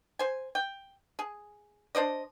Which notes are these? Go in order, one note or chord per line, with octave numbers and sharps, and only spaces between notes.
C5 G#5
G5
G#4
D4 C5 D5 D#5